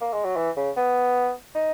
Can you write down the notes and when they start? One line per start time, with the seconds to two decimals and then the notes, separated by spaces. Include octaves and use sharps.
0.01 A#3
0.13 G#3
0.25 F#3
0.36 E3
0.57 C#3
0.77 B3
1.55 D#4